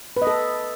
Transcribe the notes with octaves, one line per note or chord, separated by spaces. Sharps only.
B4
D#5
A4